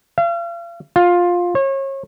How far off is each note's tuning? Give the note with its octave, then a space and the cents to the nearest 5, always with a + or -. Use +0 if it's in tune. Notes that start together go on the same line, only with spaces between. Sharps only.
F5 -40
F4 +15
C#5 -35